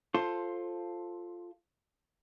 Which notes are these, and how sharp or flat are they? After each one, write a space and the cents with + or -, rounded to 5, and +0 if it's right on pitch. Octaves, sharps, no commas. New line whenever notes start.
F4 +0 A4 +0 C5 +15